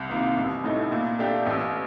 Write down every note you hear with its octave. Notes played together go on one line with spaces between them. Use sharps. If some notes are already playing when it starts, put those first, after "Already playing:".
Already playing: C2
C3 D#3 A#3 F4
A1
A2 A3 D#4
A#2
A3 D4 G4
A1